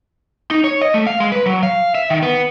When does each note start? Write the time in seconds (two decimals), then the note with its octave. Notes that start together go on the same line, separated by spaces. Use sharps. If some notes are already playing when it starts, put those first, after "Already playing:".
0.51 D#4
0.64 C#5
0.82 D#5
0.94 A3
1.07 F5
1.20 G#3
1.32 B4
1.46 F#3
1.63 F5
1.95 E5
2.10 D#3
2.22 B3